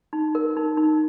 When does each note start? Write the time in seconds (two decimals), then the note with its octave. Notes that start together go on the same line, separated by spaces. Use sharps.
0.13 D#4
0.35 A#4
0.57 D#4
0.77 D#4